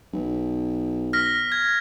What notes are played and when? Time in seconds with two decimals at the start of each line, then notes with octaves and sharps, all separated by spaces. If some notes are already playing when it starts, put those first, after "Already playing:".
0.13 B1
1.13 F6 A#6 B6
1.52 G#6